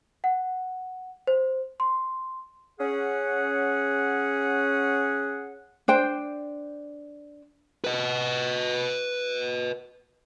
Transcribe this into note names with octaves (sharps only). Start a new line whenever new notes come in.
F#5
C5
C6
C#4 G#4 F#5
D4 C5 G5
B4 D#5